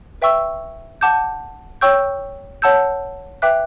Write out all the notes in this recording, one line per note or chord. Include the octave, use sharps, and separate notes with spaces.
B4 E5 G5 C#6 E6
F#5 A5 D6 G6
C#5 G5 C#6 E6 G6
C#5 F#5 A5 E6 G6
B4 E5 G5 D6 F#6